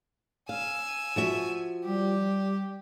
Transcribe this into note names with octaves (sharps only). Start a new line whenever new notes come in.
F5 G#5 E6
F3 F#4 E5
G3 G4